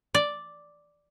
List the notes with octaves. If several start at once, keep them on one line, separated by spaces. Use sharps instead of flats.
D5